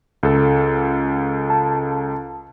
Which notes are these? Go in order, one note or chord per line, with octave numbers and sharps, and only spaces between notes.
C#2 A4
A5